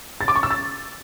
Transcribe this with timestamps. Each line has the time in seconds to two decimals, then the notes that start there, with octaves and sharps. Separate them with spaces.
0.21 A6
0.28 D6
0.36 C#6
0.43 E6
0.51 A6